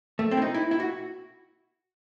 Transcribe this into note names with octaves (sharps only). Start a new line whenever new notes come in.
A3
C4
E4
D#4
E4
E4
F#4